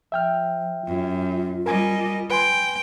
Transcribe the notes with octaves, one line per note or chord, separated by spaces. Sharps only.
F3 E5 G5 F6
F#2 F4
G3 A#4 D#5 G#5
B4 G5 G#5 C6